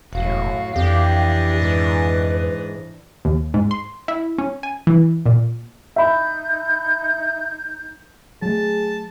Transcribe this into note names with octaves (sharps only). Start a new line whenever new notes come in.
E1 F#2 A2 F#4 F5
F2 E3 D4 G4 D#5
G#2 B4
D#2
G#2
C6
E4
C#4
G#5
E3
A#2
D#4 E5 B5 G6
F#3 A3 G#4 A5